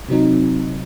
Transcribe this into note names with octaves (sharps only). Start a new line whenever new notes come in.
C3 F#3 C4 D#4